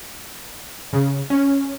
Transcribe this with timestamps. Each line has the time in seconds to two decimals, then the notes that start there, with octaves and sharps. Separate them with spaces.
0.93 C#3
1.30 C#4